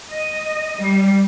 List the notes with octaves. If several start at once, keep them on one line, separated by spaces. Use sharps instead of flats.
D#5
G3